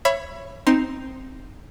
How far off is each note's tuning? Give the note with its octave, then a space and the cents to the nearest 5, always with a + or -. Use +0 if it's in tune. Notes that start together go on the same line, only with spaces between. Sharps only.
C#5 -5 E5 +25 B5 +0
C4 +0 D#4 +0 C6 +0